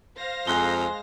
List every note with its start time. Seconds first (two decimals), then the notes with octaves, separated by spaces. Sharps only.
0.16 C5 F5 A#6
0.47 F2 G#3 G#5 A#5 F#6 G7